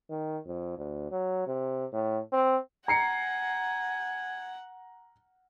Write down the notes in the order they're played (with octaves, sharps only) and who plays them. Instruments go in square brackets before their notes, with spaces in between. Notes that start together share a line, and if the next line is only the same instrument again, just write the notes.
[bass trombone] D#3
F2
D2
F#3
C3
A2
C4
[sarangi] F#5 [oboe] G#5 [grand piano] A#5 C7 C#7